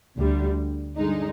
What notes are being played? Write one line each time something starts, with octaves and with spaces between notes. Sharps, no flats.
D2 D3 G3
G2 D3 G#3 D#4